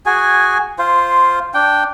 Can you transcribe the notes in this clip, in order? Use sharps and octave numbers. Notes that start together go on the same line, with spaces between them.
F#4 G#4 G#5
F4 C5
D4 G5